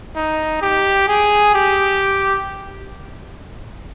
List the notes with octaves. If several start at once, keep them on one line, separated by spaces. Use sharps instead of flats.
D#4
G4
G#4
G4